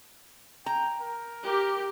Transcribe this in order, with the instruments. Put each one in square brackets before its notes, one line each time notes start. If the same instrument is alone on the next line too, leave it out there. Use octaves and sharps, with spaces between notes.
[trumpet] G5 [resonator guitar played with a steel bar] A#5
[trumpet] A#4
[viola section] G4 [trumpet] A#4